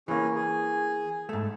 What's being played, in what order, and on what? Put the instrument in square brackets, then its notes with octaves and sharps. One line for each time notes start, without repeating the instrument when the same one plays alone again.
[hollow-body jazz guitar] E3 A#3 [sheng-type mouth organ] C#4 G#4
[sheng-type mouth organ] G#4
[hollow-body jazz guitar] G#2 A3